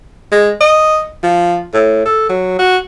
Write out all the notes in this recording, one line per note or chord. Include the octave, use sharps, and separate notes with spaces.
G#3
D#5
F3
A2
A4
F#3
F#4